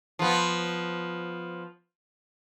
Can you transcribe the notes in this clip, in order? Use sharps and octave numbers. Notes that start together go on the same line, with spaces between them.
F3 B3